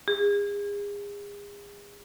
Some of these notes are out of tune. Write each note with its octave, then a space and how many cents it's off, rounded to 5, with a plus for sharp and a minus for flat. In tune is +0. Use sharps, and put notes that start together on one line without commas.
G#4 -35